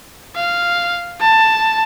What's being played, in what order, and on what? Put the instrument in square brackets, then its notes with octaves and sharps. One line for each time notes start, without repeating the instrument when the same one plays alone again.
[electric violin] F5
A5